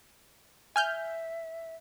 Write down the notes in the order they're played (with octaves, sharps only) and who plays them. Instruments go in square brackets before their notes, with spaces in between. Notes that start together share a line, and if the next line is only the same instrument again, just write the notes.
[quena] E5 [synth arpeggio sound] G#5 F6 G6